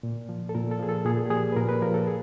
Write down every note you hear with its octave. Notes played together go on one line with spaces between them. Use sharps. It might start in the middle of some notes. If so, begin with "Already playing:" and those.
A#2
F3
A4
A#2 A#4
A4
F3 G#4
A4
A#2 G#4
G#4
G4
F3 G#4
B4
A#2 A#4
B4
F3 A#4
A4
G#4